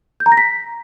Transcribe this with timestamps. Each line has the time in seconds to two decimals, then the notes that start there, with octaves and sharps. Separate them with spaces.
0.20 G6
0.26 A#5
0.32 A#6
0.37 B6